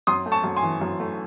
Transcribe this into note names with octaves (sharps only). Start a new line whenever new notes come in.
F#2 C6 D#6
A3
A5 C#6
F#2
G#5 C6
E3
F#2
A3